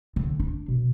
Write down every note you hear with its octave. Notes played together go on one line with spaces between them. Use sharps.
D3
D4
B2